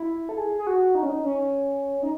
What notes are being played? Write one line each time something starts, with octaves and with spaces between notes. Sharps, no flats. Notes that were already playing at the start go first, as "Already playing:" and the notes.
Already playing: E4
A4
G#4
G#4
F#4
D#4
C#4
D#4
C#4
D#4